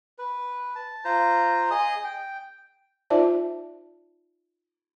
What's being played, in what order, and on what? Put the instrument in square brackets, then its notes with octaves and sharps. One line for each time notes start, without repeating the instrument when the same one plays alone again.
[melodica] B4
A5
F4 C5 A#5
G#4 D#5 D#6
G5
[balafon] D#4 F4 C5 D5 E5 A5